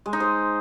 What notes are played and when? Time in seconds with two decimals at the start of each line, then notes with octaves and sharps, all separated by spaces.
0.06 G#3
0.13 D#4
0.20 C5